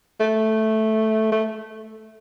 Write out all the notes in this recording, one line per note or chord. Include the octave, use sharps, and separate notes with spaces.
A3
A3